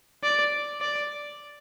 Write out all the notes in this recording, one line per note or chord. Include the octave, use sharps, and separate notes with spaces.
D5
D5